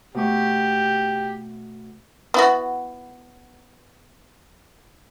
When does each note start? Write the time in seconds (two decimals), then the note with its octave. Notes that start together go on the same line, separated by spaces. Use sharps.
0.15 B2 A3 G4 C#6
2.34 B3 E4 F#4